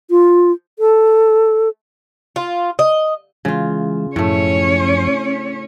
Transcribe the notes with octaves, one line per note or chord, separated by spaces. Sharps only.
F4
A4
F4
D#5
C#3 E3 G#3 F4
F#2 A2 F3 A3 C#4 C#5